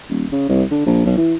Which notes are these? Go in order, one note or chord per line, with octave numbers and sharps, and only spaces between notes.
D#1
C#3
C2
D3
A#1
B1
E3